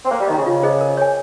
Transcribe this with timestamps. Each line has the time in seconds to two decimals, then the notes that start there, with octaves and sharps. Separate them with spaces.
0.05 C4
0.11 A#3 C5
0.20 G3
0.28 D#3 D#5
0.33 C#3 A#5
0.46 C#3 F4
0.63 G#4 C5 D#5
0.81 A#4
0.97 C#5 G#5